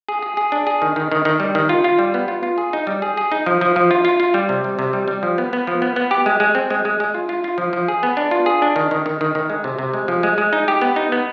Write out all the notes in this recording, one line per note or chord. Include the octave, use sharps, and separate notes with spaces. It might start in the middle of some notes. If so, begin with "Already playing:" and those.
G#4
G#4
G#4
D4
G#4
D#3
D#3
D#3
D#3
G3
D#3
F4
F4
G3
B3
F4
F4
G#4
D#4
G3
G#4
G#4
D#4
F3
F3
F3
F4
F4
F4
G3
C3
G3
C3
G3
G3
F3
B3
B3
F3
B3
B3
G4
G#3
G#3
C4
G#3
G#3
G#3
F4
F4
F4
F3
F3
G#4
B3
D4
F4
G#4
D4
D#3
D#3
D#3
D#3
D#3
G#3
C3
C3
G#3
F3
G#3
G#3
D#4
G4
B3
D#4
B3